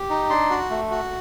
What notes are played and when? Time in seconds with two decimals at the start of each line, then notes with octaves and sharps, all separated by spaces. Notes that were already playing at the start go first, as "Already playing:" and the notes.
Already playing: G4
0.10 D#4
0.30 D4 C6
0.50 F#4
0.70 A3
0.91 F#4